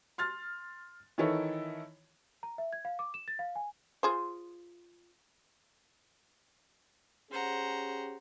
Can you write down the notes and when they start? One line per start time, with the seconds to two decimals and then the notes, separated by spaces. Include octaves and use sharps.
0.18 C6 F6 A6
1.18 D#3 E3 D#4 E4 A4 C#5
2.43 A#5
2.58 E5
2.73 G#6
2.85 F5
2.99 D6
3.14 E7
3.28 A6
3.39 F5
3.56 G#5
4.03 F4 G#4 C5
7.30 C#4 G4 G#4 C5 F#5 A#5